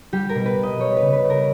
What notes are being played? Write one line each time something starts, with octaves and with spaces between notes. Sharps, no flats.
G3 G4
A#4
B2
B4
B2
D#5
G3 C#5
C#3 B4
B4
C#3
A#4